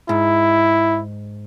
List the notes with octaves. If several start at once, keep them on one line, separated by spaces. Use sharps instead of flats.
G#2 E4